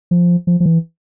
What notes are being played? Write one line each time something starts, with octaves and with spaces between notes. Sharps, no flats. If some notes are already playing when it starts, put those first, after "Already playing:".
F3
F3
F3
E3